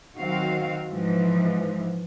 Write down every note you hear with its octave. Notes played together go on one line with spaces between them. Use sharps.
D#3 F#3 C4 F#4 F5
G#2 E3 F3 G#3